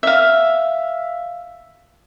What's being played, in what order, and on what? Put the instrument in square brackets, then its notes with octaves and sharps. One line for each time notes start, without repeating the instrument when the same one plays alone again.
[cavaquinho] E5 F5